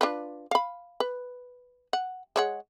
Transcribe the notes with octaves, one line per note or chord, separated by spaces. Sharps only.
D4 F4 B4
F5 B5
B4
F#5
G#3 C#5 F#5